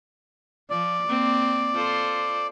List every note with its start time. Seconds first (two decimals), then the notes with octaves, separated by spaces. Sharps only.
0.70 F3 D5
1.07 A#3 C4
1.74 F4 A4 C5